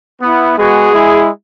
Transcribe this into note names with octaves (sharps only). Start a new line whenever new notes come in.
B3 E4
G#3 B3 F#4 G#4
G#3 E4